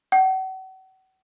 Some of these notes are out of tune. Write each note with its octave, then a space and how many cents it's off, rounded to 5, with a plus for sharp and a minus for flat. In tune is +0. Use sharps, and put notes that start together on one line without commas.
F#5 +40